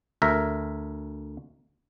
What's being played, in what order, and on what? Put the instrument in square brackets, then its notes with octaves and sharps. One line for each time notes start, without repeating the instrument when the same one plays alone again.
[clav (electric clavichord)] D2 A#4 E5